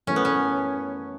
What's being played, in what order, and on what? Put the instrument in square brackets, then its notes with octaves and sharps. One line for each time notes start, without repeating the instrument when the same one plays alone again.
[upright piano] F#2 E3 A3 [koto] C#4
[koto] B3
C#4